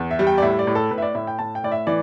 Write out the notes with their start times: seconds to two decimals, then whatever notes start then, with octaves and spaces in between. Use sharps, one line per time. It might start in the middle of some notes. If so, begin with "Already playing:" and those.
Already playing: E2
0.11 E5
0.19 G3
0.27 G5
0.38 D5
0.42 A2 E5
0.59 D5
0.67 A2
0.75 A4
0.91 A2 B4
0.98 E5
1.02 D5
1.15 A2 E5
1.27 G5
1.39 A2 A5
1.55 G5
1.64 A2 D5
1.72 E5
1.87 E3 D5